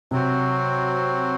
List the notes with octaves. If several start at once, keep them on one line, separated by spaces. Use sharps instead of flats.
C3 F#3 C4 F#4 C5